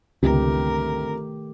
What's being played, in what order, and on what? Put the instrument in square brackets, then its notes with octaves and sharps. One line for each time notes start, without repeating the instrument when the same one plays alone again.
[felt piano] G1 C3 [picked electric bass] C#2 [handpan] D#3 A3 G4 [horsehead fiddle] A#4